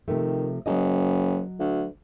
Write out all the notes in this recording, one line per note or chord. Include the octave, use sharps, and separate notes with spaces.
C3 D#3 F3 A3
F#1 F#3 D#5
D2